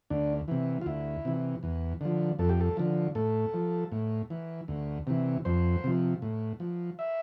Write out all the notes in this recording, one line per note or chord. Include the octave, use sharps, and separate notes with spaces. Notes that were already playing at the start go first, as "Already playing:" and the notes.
D2 D4
C3 E3
F4
D2 E4
C3 E3
E2
D3 F3
F2 A4
G4
A4
D3 F3
A2 A4
F3
A2
E3
D2
C3 E3
F2 C5
C3 F3
A2
F3
E5